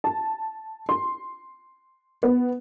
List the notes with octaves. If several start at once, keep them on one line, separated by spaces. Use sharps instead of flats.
A5
C6
B3